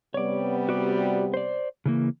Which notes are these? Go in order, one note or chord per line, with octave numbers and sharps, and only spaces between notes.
C3 G3 B3 C#5 D5
F#4 D5
C5 D5
C#3 E3 A#3